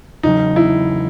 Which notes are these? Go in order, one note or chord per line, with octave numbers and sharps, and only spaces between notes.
E2 C#3 F#3 D#4
E4